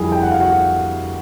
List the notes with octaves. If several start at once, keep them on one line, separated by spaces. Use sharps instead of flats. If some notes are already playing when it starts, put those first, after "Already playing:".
Already playing: F2 D3 G3 E4 G#4 G#5
G5
F#5
F5
F#4 F#5